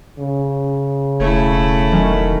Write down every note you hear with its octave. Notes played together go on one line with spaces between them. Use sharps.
C#3
E1 A3 E4 C#5
D#3 F#3 C#4